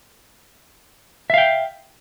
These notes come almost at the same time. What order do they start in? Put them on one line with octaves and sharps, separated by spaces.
E5 F5 G5